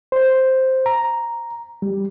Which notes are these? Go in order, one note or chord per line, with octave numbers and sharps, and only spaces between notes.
C5
A#5
G3